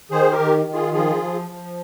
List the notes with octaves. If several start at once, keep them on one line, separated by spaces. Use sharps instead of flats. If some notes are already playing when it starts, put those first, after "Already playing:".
D#3 G#4 C5
G4 A#4
D#3
D#3
F4 G#4
F3 F4 G#4
F3
F3